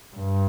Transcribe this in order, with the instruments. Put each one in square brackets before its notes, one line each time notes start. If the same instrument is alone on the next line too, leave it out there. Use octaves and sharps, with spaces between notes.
[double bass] G2